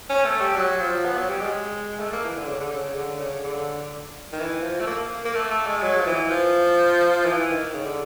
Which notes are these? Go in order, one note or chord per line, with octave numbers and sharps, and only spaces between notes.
C#4
A3
G3
F#3
F3
B3
F#3
G3
G#3
A3
A#3
E3
D3
C#3
D3
C#3
D3
C#3
D3
D#3
E3
F3
A3
A#3
A#3
A3
A3
G#3
F#3
F3
E3
F3
E3
D#3
C#3
D3